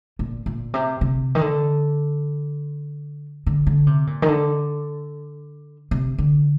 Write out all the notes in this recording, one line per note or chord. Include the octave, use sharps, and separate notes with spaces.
A#2
A#2
C3
C3
D#3
D3
D3
D3
C3
A#2
D#3
D3
C3
D3